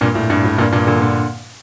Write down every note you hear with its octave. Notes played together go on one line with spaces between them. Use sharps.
G2 A#2
A2
G2
A2
G2 A#2
G2 A#2
A#2 D3
A#2 D3